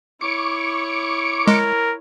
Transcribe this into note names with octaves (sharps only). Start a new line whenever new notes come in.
E4 C#5 C#6 D6
G#3 A#4